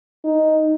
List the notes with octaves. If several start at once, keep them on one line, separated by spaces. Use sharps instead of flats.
D#4